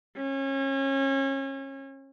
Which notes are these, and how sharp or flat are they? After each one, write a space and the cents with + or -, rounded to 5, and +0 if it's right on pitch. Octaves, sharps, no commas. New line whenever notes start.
C#4 -30